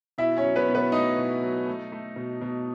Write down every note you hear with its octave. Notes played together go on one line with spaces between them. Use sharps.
B2 E4 E5
C#4 C#5
F#3
B3 B4
B2
B3 B4
A3 D#4 D#5
B2
F#3
A3
A3
B2
B2